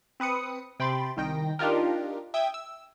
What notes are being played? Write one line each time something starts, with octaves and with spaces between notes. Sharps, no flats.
C4 B4 D#6 C#7
C3 G5 B5 C6 A6
C2 D#3 G5 A#6
D4 D#4 F4 G4 A#4
E5 G5 D#6 G#6
E6